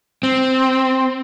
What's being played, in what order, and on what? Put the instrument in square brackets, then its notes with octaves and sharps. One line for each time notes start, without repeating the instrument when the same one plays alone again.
[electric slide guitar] C4